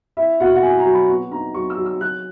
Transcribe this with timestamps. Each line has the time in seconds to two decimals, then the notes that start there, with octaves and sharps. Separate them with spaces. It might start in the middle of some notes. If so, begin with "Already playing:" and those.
0.17 E4 E5
0.40 B2 F#5
0.55 F#5
0.63 E4 G#5
0.78 A#5
0.85 F#3
0.93 B5
1.08 B3 C#6
1.31 D#4 A#5
1.54 F#3 C#6
1.70 E6
1.78 F#3
1.86 E6
2.01 F#3 F#6